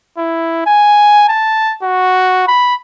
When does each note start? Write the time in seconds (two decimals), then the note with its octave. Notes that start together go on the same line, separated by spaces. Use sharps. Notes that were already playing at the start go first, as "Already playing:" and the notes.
0.18 E4
0.66 G#5
1.29 A5
1.83 F#4
2.48 B5